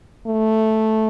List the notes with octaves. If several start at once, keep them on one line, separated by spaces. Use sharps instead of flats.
A3